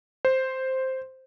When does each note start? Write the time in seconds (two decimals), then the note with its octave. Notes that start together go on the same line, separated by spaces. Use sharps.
0.25 C5